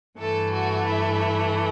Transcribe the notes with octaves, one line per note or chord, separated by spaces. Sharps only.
G2 E3 A3 A4
F#4
E4